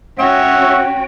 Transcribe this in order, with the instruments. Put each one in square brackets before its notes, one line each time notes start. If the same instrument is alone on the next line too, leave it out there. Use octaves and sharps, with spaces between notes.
[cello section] C#4 F#4 [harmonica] C#5 E5 [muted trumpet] F#5 [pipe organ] G5